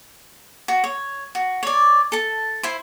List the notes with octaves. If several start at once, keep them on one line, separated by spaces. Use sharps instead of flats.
F#4
C#5
F#4
C#5 D5
A4 A5
E4 C5